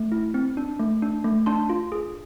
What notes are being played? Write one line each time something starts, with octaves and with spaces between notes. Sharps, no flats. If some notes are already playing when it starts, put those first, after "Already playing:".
Already playing: A3
E4
C4
D4
A3
D4
A3
D4 A5 C6
F4
G#4